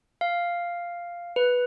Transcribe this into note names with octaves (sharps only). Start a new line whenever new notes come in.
F5
B4